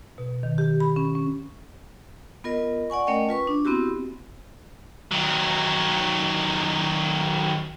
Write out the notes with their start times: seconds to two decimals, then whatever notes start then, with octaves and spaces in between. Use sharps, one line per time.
0.18 B2
0.43 D#3
0.58 G4
0.80 B5
0.96 C#4
1.15 C#4
2.44 B3 F4 A#4 D#5
2.90 D5 F#5 G#5 C#6
3.07 A3 C#4 A#4 D#5 G5
3.29 F4 B4 C#6
3.47 D4
3.65 B3 C4 E4 F#4 G4
5.11 D#3 F#3